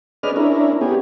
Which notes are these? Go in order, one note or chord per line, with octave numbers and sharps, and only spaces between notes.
C#4 G#4 B4 D5 D#5 F6
C#4 D4 E4 A#4
B3 C#4 G4 G#4